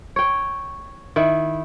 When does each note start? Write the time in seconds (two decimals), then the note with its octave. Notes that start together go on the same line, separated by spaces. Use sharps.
0.16 C#5 G5
1.16 D#3 E4